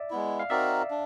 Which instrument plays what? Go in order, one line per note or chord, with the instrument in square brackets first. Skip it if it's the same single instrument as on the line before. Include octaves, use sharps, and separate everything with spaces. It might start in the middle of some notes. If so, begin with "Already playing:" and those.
Already playing: [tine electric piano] D5 E5
[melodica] G#3 B3 E4
[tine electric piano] F5
[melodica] C4 D#4 F#4 A#4 [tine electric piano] D5 E5
[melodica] D4